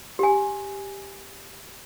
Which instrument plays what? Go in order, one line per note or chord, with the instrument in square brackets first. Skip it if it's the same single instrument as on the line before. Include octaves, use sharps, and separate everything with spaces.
[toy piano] G4 G#5